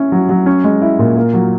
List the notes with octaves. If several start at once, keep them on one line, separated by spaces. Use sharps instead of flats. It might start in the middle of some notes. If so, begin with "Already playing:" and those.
Already playing: C#4 E4
F#3
F#3
C#4
G#3
E4
A#2
A#3
F#3